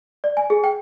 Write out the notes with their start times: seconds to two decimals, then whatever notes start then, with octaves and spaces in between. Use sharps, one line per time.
0.24 D5
0.37 G#5
0.50 G#4
0.64 G5